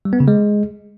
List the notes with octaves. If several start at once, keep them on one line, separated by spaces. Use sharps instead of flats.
G3
B3
C#3
G#3